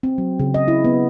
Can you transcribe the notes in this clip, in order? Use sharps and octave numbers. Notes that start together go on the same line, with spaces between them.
C4
F#3
C#3
D#5
E4
B3